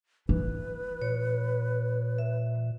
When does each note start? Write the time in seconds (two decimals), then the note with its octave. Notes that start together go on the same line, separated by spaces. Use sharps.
0.29 E3 B4
1.02 A#2 C#5
2.18 E5